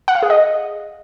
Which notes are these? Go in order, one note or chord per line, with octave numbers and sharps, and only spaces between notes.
F#5
F5
G#4
D#5